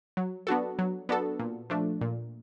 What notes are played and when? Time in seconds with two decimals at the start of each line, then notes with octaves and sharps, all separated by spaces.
0.17 F#3
0.47 B3 D4 F#4 A4
0.79 F#3
1.09 B3 D4 F#4 A4
1.39 A#2
1.70 F3 A3 D4
2.01 A#2